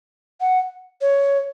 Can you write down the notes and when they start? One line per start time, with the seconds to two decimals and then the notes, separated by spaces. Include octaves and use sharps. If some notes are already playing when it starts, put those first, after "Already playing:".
0.41 F#5
1.01 C#5